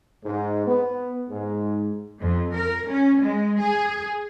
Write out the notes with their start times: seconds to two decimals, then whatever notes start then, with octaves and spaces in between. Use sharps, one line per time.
0.24 G#2
0.66 B3
1.30 G#2
2.20 F2
2.55 A#4
2.89 C#4
3.21 G#3
3.59 G#4